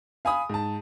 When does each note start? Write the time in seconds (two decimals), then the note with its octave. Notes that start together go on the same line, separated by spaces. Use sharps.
0.25 F5 G#5 B5 D#6
0.49 G#2 A5